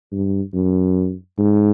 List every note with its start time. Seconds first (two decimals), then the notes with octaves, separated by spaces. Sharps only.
0.12 G2
0.54 F#2
1.39 G#2